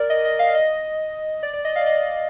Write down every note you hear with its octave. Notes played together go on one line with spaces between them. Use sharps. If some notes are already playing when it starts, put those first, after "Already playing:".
Already playing: A#4 D5
D#5
D#5
F5
D#5
D5
D5
D#5
F5
D5
D#5